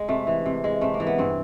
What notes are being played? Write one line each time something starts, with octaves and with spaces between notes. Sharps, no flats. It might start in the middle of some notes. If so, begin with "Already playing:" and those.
Already playing: G#3
C3 A3
E3
C3
G#3
C3 A3
A#3
E3
B3
G2 C4